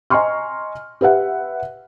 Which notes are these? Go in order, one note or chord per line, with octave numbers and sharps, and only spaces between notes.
D#5 G#5 A#5 C6 C#6 F6
G4 B4 E5 F#5